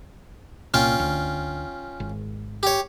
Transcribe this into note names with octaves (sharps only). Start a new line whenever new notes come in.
C2 A#2 C#4 F4 G5
D2
G#1
G4 C#5